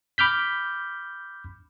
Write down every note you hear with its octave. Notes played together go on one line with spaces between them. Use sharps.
B5 D6 F6 G6 B6